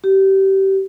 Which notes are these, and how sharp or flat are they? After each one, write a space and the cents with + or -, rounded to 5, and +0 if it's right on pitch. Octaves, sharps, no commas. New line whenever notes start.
G4 -25